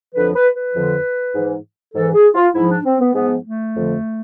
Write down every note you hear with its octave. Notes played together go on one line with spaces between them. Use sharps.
F2 D3 F3 B4
B4
B4
F2 D3 F3
G#2 E3
G#2 E3 A4
G#4
F4
G#2 F3 E4
D4
C4
B3
G#2 F3 B3
A3
F2 D3 F3